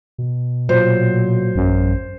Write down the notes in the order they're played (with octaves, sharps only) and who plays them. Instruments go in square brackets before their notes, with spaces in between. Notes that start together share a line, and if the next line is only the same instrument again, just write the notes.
[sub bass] B2
[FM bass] A#2 [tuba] F#3 [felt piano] C5
[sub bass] A1 [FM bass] F#2